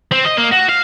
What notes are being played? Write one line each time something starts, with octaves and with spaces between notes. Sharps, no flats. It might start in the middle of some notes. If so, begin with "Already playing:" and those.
C4
D#5
A#3
F#4
F5